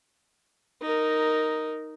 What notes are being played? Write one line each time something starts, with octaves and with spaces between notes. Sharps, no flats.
D#4 A#4